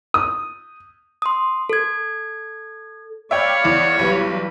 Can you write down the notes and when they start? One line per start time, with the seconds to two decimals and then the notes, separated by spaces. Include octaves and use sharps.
0.14 D#6
1.22 C6 D#6
1.69 A4 G#6
3.31 C#5 D5 E5 F5 G5 B5
3.64 E2 E4
3.99 B1 E3 G3 B4